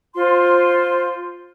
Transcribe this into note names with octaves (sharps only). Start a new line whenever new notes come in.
F4 C5 C6